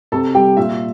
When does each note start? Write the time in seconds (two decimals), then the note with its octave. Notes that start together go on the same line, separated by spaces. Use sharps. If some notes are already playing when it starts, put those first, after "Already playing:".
0.12 C3 A4 A5
0.34 G3 G4 G5
0.57 A#2 E5